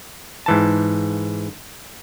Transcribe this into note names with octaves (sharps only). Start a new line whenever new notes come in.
G#2 E3 A5